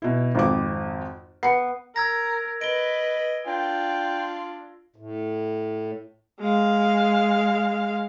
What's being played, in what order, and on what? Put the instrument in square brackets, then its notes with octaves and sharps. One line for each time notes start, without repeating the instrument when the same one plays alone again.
[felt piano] B2 E4
G#1 F2 D6
[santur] B3 [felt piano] C7 C#7
[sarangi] A#4 [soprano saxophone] A#5 [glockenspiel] E6 G#6 A#6
[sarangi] B4 [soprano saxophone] D#5 [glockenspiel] D7 G7
[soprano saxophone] D4 [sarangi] F4 [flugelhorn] G5
[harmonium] A2
[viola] G#3 F5